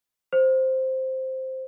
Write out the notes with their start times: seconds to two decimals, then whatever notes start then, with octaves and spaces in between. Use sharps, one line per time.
0.33 C5